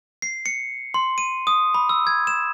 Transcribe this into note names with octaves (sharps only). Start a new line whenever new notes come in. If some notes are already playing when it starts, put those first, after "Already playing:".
C7
C#7
C6
D#7
D#6
B5
E6
G#6
E7